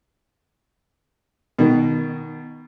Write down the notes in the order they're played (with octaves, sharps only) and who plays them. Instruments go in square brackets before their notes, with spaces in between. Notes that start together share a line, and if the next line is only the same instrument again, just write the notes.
[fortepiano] B2 D#3